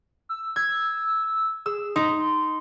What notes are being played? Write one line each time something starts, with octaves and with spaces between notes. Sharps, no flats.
E6
E6 G#6
G#4 E6
D#4 C6